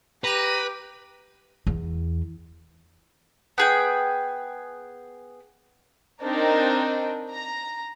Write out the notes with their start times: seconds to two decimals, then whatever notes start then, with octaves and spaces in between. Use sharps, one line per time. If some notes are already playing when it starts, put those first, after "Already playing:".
0.24 G4 B4 A#5 D#7
1.67 E2
3.58 B3 G#4 G5
6.22 C4 D4 D#4 A#4
7.32 A#5